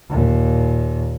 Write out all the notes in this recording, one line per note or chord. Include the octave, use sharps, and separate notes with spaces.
D#2 A#2